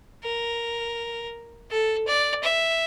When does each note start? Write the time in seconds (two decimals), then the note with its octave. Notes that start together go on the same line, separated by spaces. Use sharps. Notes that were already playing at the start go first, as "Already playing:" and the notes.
0.24 A#4
1.71 A4
2.07 D5
2.43 E5